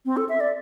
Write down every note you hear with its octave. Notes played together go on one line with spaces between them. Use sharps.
C4
A4
E5
D5